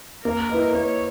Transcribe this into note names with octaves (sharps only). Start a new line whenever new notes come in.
A#3 A#4
E4 B4 D#5
A#3 C#5